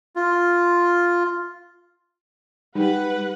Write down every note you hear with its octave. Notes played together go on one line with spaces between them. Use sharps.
F4
G3 D#4 G4 B4 F#5